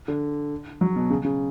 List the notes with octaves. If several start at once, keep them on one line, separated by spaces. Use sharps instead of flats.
D3
F#3
B2
C#3
C#3